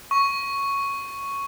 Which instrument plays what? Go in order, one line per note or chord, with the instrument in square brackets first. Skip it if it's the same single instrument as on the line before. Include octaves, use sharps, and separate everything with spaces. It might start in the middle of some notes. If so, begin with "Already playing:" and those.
[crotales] C#6